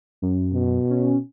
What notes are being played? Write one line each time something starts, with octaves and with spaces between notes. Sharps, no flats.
F#2
B2
C#4